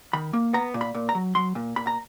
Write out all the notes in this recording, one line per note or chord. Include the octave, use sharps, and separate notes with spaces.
D#3 B5
A#3
B3 A#5
A#2
B5
A#2
A#5
F#3
F#3 C6
A#2
A#2 B5
A#5